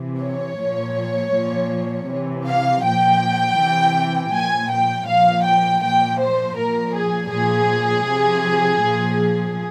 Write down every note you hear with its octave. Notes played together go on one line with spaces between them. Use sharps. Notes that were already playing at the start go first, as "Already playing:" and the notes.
Already playing: C3 E3
C#5
A#2 F3
A#2 F3
C3 E3
F5
A#2 F3 G5
C3 E3
A#2 F3 G#5
G5
A#2 F3 F5
G5
A#2 F3 G5
C5
A#2 F3 A#4
G#4
A#2 F3 G#4
C3 F3
A#2 F3